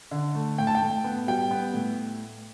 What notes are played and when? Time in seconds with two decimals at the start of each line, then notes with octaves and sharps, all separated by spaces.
0.11 D3
0.35 A3
0.58 A2 G5
0.67 A5
0.75 G5
0.82 A2
1.04 B3
1.28 G3 G5
1.51 B3
1.74 A2